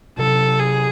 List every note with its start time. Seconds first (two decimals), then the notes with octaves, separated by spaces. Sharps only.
0.19 C3 F#3 C#4 A4
0.60 G#4